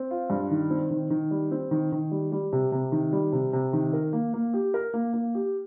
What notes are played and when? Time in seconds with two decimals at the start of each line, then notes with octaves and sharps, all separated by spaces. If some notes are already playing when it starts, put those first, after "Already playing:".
Already playing: C4
0.11 F4
0.30 G2
0.51 D#3
0.70 C4
0.91 D#3
1.10 D#3
1.31 G3
1.51 C4
1.71 D#3
1.92 D#3
2.11 G3
2.32 G3
2.53 C3
2.72 C3
2.92 D#3
3.13 G3
3.33 C3
3.53 C3
3.73 D#3
3.93 A#4
4.13 A#3
4.34 A#3
4.54 G4
4.74 A#4
4.94 A#3
5.14 A#3
5.35 G4